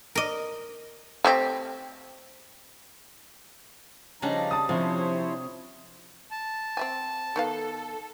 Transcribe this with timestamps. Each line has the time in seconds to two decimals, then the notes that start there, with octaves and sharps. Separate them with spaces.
0.15 A#4 D#5
1.25 A3 C4 G4
4.22 C#3 F3 G3 D4 D#4 A#5
4.51 A5 D#6
4.69 C3 F3 E4 C5 C#5
6.31 A5
6.77 C4 E5 G#5
7.36 D#3 B3 A4 F5